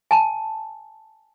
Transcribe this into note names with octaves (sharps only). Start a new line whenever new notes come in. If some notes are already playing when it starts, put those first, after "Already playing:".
G#5 A5